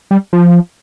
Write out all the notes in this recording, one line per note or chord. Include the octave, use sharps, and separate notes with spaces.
G3
F3